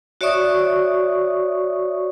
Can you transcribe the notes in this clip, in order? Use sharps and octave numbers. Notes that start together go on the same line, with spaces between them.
F#4 C#5 D5 E5 C#6 D#6